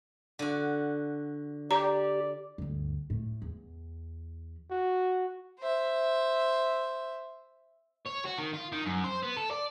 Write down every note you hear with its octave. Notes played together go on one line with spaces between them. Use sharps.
D3 F#4
G4 D5 A#5
D2 G2
A2
E2
F#4
C5 E5
C#5
F#4
D#3
F4
D#3
F#2
C5
B3
A4
D5